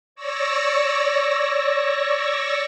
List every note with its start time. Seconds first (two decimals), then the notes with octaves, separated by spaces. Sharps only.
0.16 C#5 D5 C#6 E6 A#6